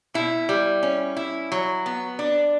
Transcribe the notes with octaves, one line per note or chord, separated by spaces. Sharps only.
B2 E4
G3
C#4
E4
F#3
B3
D4